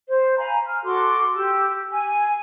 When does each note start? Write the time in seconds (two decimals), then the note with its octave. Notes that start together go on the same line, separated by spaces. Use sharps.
0.09 C5
0.38 F5 G#5 A#5 B5
0.66 F6
0.85 F#4 A4 C6 D6
1.35 G4 E6
1.90 G#5